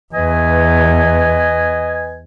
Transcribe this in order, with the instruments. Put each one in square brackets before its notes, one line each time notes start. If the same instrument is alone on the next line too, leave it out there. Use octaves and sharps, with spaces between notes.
[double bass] E2 [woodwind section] B4 D#5 G#5